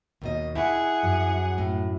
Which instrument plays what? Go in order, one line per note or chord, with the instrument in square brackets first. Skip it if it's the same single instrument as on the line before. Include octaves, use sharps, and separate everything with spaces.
[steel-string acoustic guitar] D#2 B2 D#5
[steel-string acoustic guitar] E4 [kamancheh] G#4 F#5
[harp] F#2
[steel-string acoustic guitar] A2